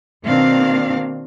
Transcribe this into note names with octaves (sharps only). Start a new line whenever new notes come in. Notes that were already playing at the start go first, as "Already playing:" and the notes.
B2 D#3 A#3 C4 D4 F5